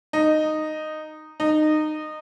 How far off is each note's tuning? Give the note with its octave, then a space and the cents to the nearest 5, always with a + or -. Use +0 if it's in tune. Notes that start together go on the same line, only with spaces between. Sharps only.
D#4 -10
D#4 -20